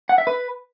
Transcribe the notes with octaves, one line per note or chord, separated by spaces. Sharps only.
F#5
E5
B4